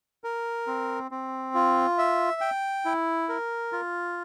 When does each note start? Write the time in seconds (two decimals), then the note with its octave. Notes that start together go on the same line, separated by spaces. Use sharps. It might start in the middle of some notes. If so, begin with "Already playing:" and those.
0.24 A#4
0.67 C4
1.11 C4
1.55 F4
1.98 E5
2.41 G5
2.85 E4
3.29 A#4
3.73 F4